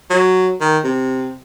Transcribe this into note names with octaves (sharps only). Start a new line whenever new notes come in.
F#3
D#3
C3